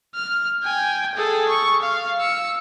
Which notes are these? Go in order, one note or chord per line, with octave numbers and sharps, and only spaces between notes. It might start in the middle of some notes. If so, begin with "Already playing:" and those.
F6
G5 G#5
G#4 A4
C#6
F5
E6 C#7